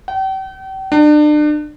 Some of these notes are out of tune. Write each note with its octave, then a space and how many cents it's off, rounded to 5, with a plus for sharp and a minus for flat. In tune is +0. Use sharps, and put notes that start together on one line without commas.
G5 -40
D4 +35